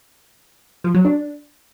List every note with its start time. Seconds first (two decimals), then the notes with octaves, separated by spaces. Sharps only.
0.84 F3
0.95 F#3
1.05 D4